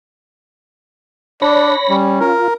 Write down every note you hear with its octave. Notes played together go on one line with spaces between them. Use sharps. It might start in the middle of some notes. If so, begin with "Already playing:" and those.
D4 C#5 D5 B5 A#6
G3 C#4
F4 A#4